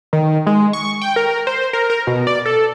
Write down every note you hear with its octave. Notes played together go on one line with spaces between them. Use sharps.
D#3
G#3
C#6
G5
A#4
C5
A#4
A#4
B2
D5
A4